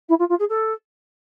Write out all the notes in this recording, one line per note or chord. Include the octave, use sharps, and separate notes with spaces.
E4
F4
F4
G#4
A4